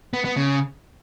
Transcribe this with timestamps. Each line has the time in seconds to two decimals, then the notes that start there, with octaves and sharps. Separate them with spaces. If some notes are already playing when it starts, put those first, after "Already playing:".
0.13 B3
0.25 B3
0.36 C#3